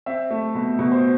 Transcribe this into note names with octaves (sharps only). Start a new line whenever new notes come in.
C4 E5
A3
B2
B2
C5